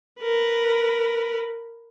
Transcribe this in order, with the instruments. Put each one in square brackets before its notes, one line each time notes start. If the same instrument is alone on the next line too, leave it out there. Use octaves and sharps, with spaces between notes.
[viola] A#4 B4